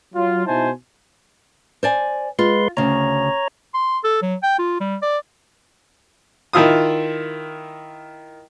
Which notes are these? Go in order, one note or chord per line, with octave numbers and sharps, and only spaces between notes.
F#3 F4
B2 D#4 E4 C5 G#5 A5
C5 D5 G#5
G#3 F4 B4 C6
D2 C#3 C#5 A#5
C6
A4
F#3
G5
F4
G3
D5
D#3 E4 F4 D#6